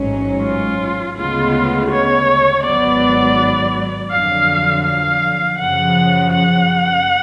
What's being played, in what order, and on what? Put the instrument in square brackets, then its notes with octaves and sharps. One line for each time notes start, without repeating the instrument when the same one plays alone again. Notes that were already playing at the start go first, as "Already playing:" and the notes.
Already playing: [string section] A1 G#2 F#3 C#4
[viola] F4
[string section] D2 C#3 G#3 B3 [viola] F4
[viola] C#5
[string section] G#1 G#2 F#3 B3 [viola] D5
[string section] F2 D3 F#3 [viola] F5
[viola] F5
[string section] F#2 C#3 F3 [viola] F#5
[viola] F#5